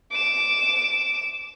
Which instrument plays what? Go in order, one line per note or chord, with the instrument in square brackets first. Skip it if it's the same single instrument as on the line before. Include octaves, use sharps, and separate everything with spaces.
[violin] D6 E7